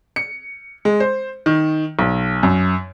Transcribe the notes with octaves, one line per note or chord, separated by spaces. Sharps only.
C#7
G#3
C5
D#3
B1
F#2